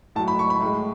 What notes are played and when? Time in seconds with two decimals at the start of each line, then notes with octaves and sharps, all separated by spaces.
0.15 A2 A5
0.19 F#3
0.28 B5
0.39 C#6
0.50 B5
0.61 A2 G#3